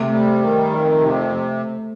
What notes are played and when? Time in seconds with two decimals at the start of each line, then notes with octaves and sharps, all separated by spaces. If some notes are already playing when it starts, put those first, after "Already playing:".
Already playing: C3 A3
0.12 G3
0.42 D#3
0.70 F2
1.00 C3